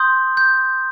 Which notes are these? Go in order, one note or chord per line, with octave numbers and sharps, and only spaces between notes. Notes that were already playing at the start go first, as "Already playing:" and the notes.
Already playing: C6 D#6 G6
G6